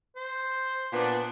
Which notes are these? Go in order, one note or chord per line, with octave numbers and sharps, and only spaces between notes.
C5
A#2 B3 D4